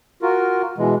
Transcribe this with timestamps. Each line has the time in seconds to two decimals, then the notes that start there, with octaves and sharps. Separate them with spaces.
0.22 F4 F#4 A#4
0.78 B2 E3 G#3